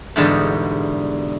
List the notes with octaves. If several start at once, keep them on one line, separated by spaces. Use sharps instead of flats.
E2 G#2 B2 D3 G3 A5